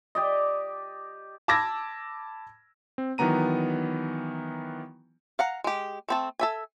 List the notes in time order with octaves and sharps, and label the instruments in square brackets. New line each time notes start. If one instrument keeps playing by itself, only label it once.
[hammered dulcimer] G4 D5 D#5
[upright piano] A5 B5 D6 E6 G#6 A#6
[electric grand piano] C4
D#3 E3 F#3 B3 A#5 D#7
[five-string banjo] F5 F#5 A#5
G#3 G4
A3 C4 A5
A4 E5 G#5